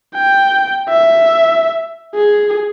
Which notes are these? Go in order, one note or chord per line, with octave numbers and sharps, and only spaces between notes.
G5
E5
G#4